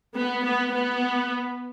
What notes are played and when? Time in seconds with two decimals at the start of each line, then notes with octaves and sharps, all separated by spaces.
0.15 B3
0.44 B3
0.72 B3